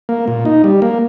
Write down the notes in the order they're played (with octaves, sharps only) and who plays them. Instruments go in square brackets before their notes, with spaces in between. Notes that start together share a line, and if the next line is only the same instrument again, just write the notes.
[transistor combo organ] A#3
A#2
D#4
G3
A#3